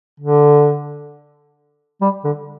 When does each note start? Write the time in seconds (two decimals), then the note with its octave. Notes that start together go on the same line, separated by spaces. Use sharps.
0.20 D3
2.01 G3
2.24 D3